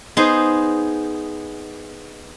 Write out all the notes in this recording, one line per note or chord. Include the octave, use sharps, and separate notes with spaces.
B3 D#4 G#4 C5